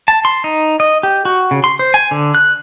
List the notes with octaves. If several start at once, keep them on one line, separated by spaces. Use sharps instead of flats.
A5
C6
D#4
D#5
G4
F#4
C#3
C6
C5
G#5
D3
F#6